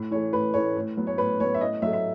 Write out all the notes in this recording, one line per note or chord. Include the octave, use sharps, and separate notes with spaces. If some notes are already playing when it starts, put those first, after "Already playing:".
Already playing: A2
E3 A3 C#5
A2 B4
E3 A3 C#5
A2
F#3 B3
C#5
A2 B4
F#3 B3 C#5
E5
A2 D#5
F#3 A3 E5
E5